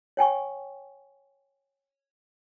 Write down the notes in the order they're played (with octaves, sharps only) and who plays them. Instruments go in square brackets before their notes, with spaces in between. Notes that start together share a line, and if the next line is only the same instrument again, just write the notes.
[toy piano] C#5 G5 G#5 C#6